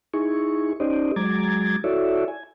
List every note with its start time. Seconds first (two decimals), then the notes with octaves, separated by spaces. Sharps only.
0.14 D#4 E4 G#4 C#6
0.80 C#4 D#4 G4 C5 D5 D#5
1.16 F#3 G#3 A#5 D6 G#6 A6
1.84 E4 F#4 A4 C#5 D5 E5
2.28 G#5